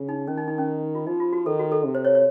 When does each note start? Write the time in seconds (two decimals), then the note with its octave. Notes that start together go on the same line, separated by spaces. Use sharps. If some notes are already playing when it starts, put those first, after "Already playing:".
Already playing: C#3
0.09 D#4
0.28 D#3 C#4
0.38 D#4
0.48 D#4
0.58 C#4
0.95 F4
1.07 F3 D#4
1.20 F4
1.33 F#4
1.46 D#3 A4
1.59 F#4
1.72 A4
1.85 C3
1.95 C5
2.05 C#5
2.15 C#5